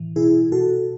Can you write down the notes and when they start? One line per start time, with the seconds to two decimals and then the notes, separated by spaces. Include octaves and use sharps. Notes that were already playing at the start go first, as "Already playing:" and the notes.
Already playing: A2 E3
0.16 B2 E4 G#4
0.52 B2 F#4 A4